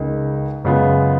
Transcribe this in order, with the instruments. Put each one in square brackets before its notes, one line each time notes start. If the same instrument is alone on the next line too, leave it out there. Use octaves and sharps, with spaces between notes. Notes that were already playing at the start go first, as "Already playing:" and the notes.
Already playing: [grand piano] C#2 C#3 G#3 D#4 A#4
F#2 C#3 G#3 B3 F4